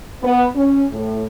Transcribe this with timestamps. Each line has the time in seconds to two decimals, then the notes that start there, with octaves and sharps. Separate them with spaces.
0.21 B3
0.54 C#4
0.89 A2